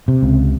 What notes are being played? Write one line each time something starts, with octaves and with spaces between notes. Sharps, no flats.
C3
C#2